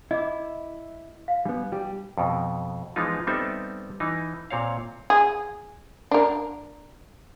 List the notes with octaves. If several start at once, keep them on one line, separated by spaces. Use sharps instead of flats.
E4 D#5 D6
F5
G3 B3 D4
G3 G4
F2 B2
E3 F3 G#3 B3 D#4 F4
G3 B3 C4 D#4 A4 E5
E3 D#4
A#2 C4 C#5 F5
G#4
D4 A#4